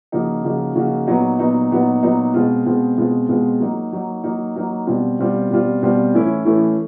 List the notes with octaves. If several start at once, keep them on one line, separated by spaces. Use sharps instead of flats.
C#3 F3 A#3 D#4 F#4
C#3 F3 A#3 D#4 F#4
C#3 F3 A#3 D#4 F#4
A#2 F#3 B3 D#4
A#2 F#3 B3 D#4
A#2 F#3 B3 D#4
A#2 F#3 B3 D#4
B2 G#3 C4 F4
B2 G#3 C4 F4
B2 G#3 C4 F4
B2 G#3 C4 F4
F#3 A#3 D#4
F#3 A#3 D#4
F#3 A#3 D#4
F#3 A#3 D#4
B2 G3 C4 F4
B2 G3 C4 F4
B2 G3 C4 F4
B2 G3 C4 F4
A2 E3 A3 C#4 E4
A2 E3 A3 C#4 E4